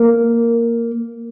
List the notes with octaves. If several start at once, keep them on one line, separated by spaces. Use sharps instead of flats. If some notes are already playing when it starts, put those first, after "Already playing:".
Already playing: A#3